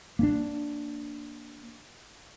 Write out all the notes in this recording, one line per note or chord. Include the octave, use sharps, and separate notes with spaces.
A#3 C#4 D4